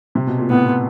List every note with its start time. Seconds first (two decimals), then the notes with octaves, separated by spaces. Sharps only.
0.15 C3
0.27 B2
0.39 A#2
0.50 A2 B3